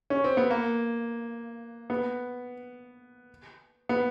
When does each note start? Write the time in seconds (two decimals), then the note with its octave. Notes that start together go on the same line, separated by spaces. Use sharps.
0.10 C#4
0.24 C4
0.37 B3
0.50 A#3
1.90 B3
3.89 B3